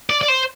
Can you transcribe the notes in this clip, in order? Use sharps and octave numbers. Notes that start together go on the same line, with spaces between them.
D5
D5
C5